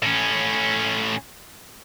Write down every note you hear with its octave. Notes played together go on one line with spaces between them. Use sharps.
A2 C#4